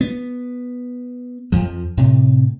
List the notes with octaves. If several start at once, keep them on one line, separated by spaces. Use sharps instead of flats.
B3
F2 F3
A2 C3